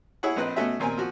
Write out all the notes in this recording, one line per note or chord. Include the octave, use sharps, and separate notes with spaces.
E4 G#4 C#5 F#5
A#1 C4 B4 D#5 F#6
B2 A3 C#4 F#4 E5
D#2 A#2 C4 A#4 G#5
F3 F#4